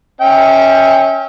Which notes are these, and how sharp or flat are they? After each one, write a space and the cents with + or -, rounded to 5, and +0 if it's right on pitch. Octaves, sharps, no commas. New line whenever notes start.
C#4 -5 E5 -30 G5 +15